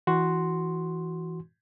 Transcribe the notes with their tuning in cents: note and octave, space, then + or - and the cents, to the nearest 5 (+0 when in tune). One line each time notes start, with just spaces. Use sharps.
E3 +0 F#4 +0 C6 +0